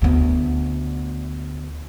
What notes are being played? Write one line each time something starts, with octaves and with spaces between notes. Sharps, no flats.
D2 B3